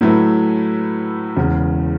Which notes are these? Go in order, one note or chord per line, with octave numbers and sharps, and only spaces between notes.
A2 F#3 A3 E4 B4
E1 E2 C#3